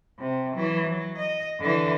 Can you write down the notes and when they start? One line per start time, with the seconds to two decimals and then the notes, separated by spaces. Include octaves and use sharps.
0.19 C3
0.56 E3 F#3
0.86 F#3
1.18 D#5
1.60 D3 E3